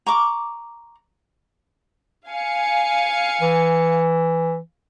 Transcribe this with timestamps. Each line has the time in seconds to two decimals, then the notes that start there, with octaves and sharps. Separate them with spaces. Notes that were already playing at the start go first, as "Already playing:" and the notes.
0.06 A#5 C#6 D6
2.28 F5 G#5 C#7
3.41 E3